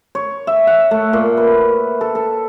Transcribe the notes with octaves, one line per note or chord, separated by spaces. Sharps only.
C#5
E5
F#5
A3
A#2
B4
A4
A4